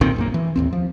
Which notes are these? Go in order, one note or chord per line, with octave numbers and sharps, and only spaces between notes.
B1 A#2 D#3 C4
A#1 F#2 A#3
E3
A1 D#2 C4
F3